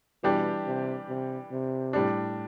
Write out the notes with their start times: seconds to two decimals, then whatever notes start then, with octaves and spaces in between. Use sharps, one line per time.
0.23 B2 E3 G3 D4 G4
0.66 C3
1.09 C3
1.51 C3
1.93 A2 G3 D4